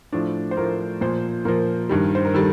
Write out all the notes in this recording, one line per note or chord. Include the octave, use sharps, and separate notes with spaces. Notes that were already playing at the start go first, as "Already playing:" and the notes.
A2 F3 D4
C5
A2 F3 A#4
A#2 F3 C5
A#2 F3 A#4
G2 D#3 G3
C5
A#4
D#3 G3 A4